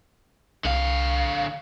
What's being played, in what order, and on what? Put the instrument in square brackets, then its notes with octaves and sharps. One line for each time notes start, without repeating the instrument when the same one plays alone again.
[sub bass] C2 [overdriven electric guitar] D3 F5